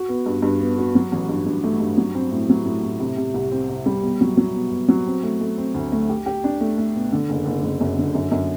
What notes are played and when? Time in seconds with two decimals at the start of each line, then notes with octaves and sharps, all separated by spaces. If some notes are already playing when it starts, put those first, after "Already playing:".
Already playing: F#4
0.09 B3
0.26 G2
0.42 G2
0.61 B3
0.78 F#4
0.95 F#3
1.12 A1
1.29 G2
1.46 G2
1.64 A3
1.80 G2
1.97 F#3
2.15 C4
2.31 A2
2.50 F#3
2.65 A2
2.84 A2
3.00 C3
3.17 C3
3.34 C2
3.52 C4
3.70 C3
3.86 G3
4.03 B2
4.21 F#3
4.37 F#3
4.55 B2
4.71 B2
4.88 F#3
5.06 C4
5.23 A3
5.41 A3
5.58 C4
5.74 D2
5.92 A3
6.09 G4
6.26 G4
6.44 D4
6.61 A3
6.78 A3
6.96 B2
7.12 D3
7.29 F#1
7.46 F#1
7.63 F#1
7.81 F#2
7.98 D3
8.15 F#2
8.32 F#2